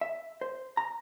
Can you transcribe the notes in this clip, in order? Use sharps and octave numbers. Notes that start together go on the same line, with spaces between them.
E5
C5
A#5